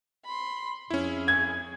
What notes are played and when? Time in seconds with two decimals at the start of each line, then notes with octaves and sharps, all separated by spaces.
0.25 B5 C6
0.90 F2 C#4 E4 G#4
1.28 G#6